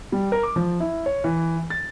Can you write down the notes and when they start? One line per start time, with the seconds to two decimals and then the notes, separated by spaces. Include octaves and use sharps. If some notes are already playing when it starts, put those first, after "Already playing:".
0.12 G3
0.32 A#4
0.43 D6
0.56 F3
0.80 E4
1.06 C#5
1.24 E3
1.70 A6